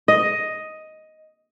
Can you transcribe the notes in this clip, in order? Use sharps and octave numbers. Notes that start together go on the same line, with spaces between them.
D#5